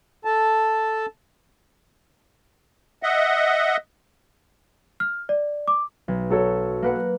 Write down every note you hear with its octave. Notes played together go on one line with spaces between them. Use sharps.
A4 A5
D#5 E5 F#5
F6
D5
D6
B1
F#3 A4 C#5
A#3 B4 F#5